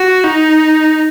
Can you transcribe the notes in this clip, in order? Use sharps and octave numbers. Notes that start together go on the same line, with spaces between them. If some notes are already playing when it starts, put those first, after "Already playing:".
Already playing: F#4
D#4